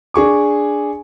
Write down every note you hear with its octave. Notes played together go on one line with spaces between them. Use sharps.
D4 G#4 C#6 D6